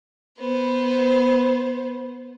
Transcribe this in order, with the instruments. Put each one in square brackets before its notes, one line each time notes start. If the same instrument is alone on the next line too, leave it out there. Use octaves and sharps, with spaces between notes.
[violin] B3 C5